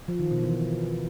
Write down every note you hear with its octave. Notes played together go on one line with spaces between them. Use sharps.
F3
D#3
B2
E3